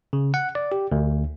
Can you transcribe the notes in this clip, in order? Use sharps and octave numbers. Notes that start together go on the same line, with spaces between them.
C#3
F#5
D5
G4
D2